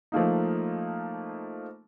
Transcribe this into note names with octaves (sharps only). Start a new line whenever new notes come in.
F3 A3 A#3 D#4